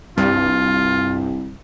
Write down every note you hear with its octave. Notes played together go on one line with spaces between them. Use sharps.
C2 G2 F4